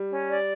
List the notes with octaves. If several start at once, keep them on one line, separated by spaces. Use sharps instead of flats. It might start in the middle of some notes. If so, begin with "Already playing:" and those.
Already playing: G3
C#4
D5